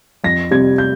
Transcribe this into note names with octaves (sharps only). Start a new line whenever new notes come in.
F2 A#6
C3 G3 C4 G#6
G6